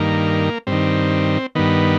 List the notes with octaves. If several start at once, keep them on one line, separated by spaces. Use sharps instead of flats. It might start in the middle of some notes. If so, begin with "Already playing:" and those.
Already playing: G2 D#3 A#3
G2 C4
D#3
G2 D#3 B3